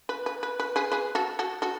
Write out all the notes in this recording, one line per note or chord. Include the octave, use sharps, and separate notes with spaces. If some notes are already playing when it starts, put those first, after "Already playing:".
B4
B4
B4
B4
G#4 B4
G#4 B4
F#4 A4
F#4 A4
F#4 A4